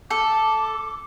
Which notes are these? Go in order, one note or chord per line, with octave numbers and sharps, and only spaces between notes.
A4 D6